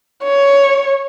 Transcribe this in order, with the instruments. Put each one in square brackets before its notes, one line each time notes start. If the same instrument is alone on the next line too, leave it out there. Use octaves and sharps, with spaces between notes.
[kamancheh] C#5